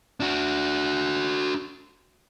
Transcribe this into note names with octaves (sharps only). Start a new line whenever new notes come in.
D4 F#4